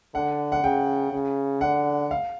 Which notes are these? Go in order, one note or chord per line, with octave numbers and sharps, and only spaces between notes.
D3 F#5
F#5
C#3 G5
C#3
D3 F#5
F5